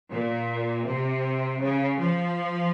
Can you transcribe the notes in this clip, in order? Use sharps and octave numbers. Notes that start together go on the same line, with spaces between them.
A#2
C3
C#3
F3